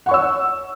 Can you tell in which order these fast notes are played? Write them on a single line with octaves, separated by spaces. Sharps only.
F#5 C#6 C#5 E6